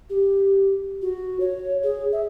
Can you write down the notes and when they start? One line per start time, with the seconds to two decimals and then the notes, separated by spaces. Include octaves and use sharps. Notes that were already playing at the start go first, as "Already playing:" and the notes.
0.10 G4
1.02 F#4
1.40 C#5
1.83 G#4
2.12 E5